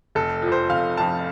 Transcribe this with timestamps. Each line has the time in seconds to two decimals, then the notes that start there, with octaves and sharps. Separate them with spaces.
0.15 F1 A4
0.42 F3
0.47 F2 C5
0.70 F1 F5
0.97 F2 F3 A5